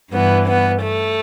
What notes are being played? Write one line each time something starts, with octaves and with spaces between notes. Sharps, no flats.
G2 E3 B3
B3
A3